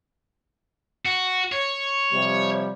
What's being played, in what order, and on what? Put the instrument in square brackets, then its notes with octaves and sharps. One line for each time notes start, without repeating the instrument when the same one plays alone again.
[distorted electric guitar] F#4
C#5
[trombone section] C3 F3 G3